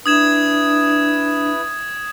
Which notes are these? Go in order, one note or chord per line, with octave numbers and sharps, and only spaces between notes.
D4 E4 B4 D#6 G#6 E7